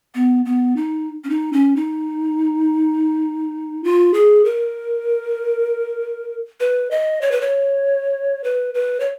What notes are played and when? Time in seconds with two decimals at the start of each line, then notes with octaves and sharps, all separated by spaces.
0.15 B3
0.46 B3
0.76 D#4
1.24 C#4
1.30 D#4
1.53 C#4
1.76 D#4
3.84 F4
4.14 G#4
4.45 A#4
6.60 B4
6.91 D#5
7.22 C#5
7.31 B4
7.41 C#5
8.44 B4
8.74 B4
9.00 C#5